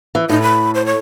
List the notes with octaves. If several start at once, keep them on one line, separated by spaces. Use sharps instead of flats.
E3
A2 D#4
B5
C5
C#5